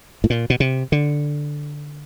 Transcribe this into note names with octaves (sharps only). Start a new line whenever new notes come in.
A2
A#2
B2
C3
D3